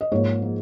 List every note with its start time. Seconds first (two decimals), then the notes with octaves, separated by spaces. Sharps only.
0.01 D#5
0.12 G#2 F3 A#3 C#5
0.42 F3 A#3